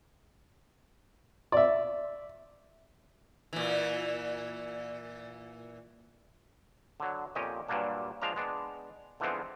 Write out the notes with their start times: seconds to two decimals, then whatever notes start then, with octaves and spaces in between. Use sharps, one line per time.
1.52 D5 E5
3.53 A#2 E3
7.00 D3 F#3
7.35 F2 A#2 C#4 G4 D#5
7.68 G2 A#2 F#3 G3 A#3 D4
8.22 F3 G#3 D4 F5 A#5
8.36 G#3 B3 D4
9.20 D3 E3 F3 G#3 B3 C4